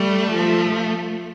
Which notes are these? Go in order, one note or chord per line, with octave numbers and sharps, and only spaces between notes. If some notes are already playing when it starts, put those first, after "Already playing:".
Already playing: G3 A3
F3